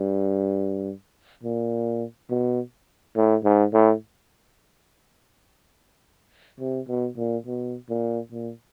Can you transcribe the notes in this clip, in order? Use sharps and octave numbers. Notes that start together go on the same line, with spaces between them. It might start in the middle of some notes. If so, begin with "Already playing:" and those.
Already playing: G2
A#2
B2
A2
G#2
A2
C3
B2
A#2
B2
A#2
A#2